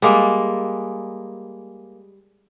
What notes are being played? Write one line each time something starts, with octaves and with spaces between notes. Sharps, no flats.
G3 G#3 A#3